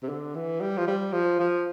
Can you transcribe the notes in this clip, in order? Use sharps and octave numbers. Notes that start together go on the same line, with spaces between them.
C3
D3
E3
G3
F3
G3
F3
F3